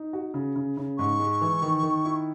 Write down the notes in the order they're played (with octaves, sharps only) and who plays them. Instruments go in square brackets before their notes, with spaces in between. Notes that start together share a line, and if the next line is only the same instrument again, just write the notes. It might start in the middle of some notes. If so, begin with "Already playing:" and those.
Already playing: [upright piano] D#4
F#4
C#3
C#3
C#3
[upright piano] G#2 [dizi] C#6
[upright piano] G#3
E3
D#3
D#3
E4